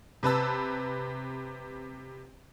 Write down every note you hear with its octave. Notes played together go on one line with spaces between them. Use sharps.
C3 B4 A5 E6